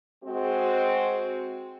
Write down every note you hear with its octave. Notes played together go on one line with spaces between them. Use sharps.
G#3 C4 F#4